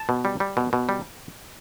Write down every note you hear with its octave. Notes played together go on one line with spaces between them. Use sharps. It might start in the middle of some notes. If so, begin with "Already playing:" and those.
Already playing: A5
B2
G3
G3
B2
B2
G3